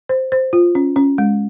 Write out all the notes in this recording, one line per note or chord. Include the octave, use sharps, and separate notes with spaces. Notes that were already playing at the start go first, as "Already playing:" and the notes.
C5
C5
F4
C#4
C#4
G#3